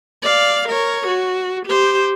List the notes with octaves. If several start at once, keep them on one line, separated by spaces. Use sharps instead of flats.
D5 F5
A#4 C#5
F#4
G4 C5